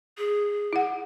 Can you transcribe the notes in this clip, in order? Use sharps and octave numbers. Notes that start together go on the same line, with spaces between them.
G#4
E4 F#5